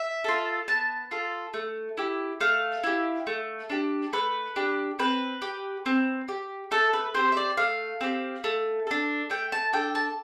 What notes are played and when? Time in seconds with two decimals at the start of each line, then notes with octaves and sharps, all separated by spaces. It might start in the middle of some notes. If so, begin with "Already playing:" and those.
Already playing: E5
0.24 F4 A4
0.68 B3 A5
1.11 F4 A4
1.54 A3
1.97 E4 G4
2.40 A3 F5
2.84 E4 G4
3.27 A3
3.70 D4 G4
4.13 A3 B4
4.56 D4 G4
4.99 C4 B4
5.42 G4
5.86 C4
6.29 G4
6.71 A3 A4
6.93 B4
7.15 C4 G4 C5
7.32 E5
7.37 D5
7.57 A3 F5
8.01 C4 G4
8.44 A3
8.87 D4 A4
9.30 A3 G5
9.52 A5
9.73 D4 A4 G5
9.95 A5